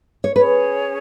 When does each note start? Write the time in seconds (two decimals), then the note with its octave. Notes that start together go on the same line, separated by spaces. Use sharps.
0.24 C#5
0.36 C#4 G#4 B4 C#5